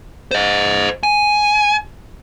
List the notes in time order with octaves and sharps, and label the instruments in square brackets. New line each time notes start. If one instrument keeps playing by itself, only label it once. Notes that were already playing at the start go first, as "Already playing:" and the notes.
[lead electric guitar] C5 D#5
G#5